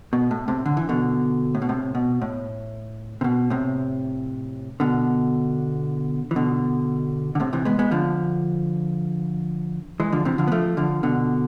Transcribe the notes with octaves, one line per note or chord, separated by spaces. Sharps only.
B2
A2
A2 C3
D3
E3
B2 D3
A2
B2
A2 C3
B2
A2
C3
B2
A2 C3
B2 D3
E3
B2 D3
D3
A2 C3
C3 E3
G#3 B3
G#3 B3
D3 F3
E3 G#3
D3 F3
C3 E3
D3 F3
B3
F3 A3
D3 F3
B2 D3